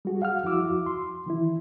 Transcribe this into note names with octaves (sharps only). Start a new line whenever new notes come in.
G3 F#4 G#4
F5 F#5 F6
F2 F3 E4 F#4 D6 E6
C6
D#3 E3 E4